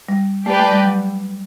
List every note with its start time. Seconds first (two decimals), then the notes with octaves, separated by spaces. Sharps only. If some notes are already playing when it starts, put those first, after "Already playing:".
0.09 G3
0.46 A3 G4 B4 D5
0.60 A3
0.72 G3
0.85 F#3